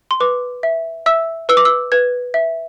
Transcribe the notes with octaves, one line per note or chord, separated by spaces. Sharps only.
C6
B4 D6
E5
E5 E6
B4 E6
D6
E6
B4 G#6
E5